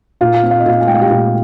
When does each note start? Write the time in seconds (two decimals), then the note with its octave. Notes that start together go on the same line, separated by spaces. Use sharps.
0.21 A#2 F4 F5
0.43 C4
0.51 F5
0.60 D#5
0.66 A#2 F4 F5
0.80 G#5
0.87 G#3 G5
0.94 F5
1.01 G4 G5
1.10 A#2